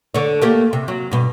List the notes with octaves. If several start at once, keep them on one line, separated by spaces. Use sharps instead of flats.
D3 C#5
A3 A#3 G4
C3
F#3
G2 B2